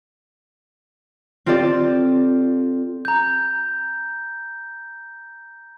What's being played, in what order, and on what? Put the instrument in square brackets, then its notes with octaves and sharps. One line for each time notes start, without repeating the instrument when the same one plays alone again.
[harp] C4 F4 G4 A4 D5
[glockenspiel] A#5 G6